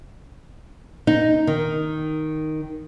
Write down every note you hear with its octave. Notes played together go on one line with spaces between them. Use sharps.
D#4
D#3